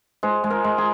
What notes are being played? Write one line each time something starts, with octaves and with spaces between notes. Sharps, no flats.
G#3 C5
G#3
A#4
G#3
G#4